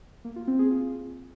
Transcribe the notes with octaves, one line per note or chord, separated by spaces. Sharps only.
A#3
F4
C4
G#4
F4